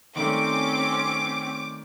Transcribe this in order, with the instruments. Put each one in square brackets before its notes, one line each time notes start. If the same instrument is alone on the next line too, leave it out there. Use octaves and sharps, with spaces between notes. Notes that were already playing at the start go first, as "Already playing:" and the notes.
[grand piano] D#3 G3 A3 [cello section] C4 C#4 [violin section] D6